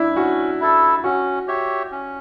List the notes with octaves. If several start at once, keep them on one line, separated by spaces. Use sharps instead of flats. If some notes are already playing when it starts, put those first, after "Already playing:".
Already playing: D4 E4
C#4 F#4
E4 A4
C#4 F#4
G4 C#5 E5
C#4